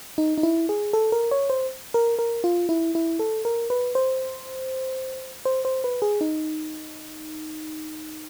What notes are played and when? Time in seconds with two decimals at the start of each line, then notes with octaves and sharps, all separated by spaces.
0.18 D#4
0.38 D#4
0.43 E4
0.69 G#4
0.93 A4
1.12 A#4
1.31 C#5
1.50 C5
1.94 A#4
2.19 A#4
2.44 F4
2.69 E4
2.95 E4
3.19 A4
3.45 A#4
3.70 B4
3.95 C5
5.45 C5
5.65 C5
5.84 B4
6.02 G#4
6.21 D#4